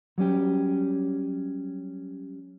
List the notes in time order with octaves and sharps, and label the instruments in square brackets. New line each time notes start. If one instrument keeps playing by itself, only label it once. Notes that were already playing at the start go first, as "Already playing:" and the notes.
[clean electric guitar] F#3 G3 C#4 G4